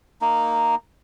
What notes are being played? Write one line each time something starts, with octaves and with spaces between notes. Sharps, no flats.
A#3 D#4